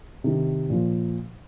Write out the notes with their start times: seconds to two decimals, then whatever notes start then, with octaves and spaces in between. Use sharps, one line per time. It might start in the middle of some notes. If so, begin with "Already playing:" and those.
0.24 C3 D#3
0.70 A#2 F3